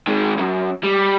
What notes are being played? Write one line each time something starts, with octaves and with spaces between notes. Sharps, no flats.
D#3 G#3
C2 F#2
G3